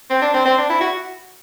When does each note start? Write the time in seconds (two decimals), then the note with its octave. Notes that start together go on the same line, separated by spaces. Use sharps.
0.10 C4
0.22 D4
0.34 C4
0.45 C4
0.58 D4
0.69 E4
0.81 F#4